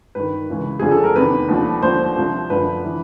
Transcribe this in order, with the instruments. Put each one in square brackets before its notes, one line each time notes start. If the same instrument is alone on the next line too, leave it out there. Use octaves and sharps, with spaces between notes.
[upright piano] G2 D#3 B4
C#2 C#3 E3
F2 D3 F3 G#4
A4
A#4
E2 C3 D#3 B4
D#2 D3 F3
D#2 D3 F3 C5
C2 C3 F3
F#2 D3 F3 B4
E3